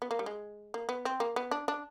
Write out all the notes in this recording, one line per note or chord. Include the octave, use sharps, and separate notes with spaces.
B3
A#3
G3
G#3
A#3
B3
C4
A#3
B3
D4
D4